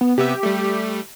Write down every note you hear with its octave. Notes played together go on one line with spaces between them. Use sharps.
B3
C3 B3 G4 E5
G3 A3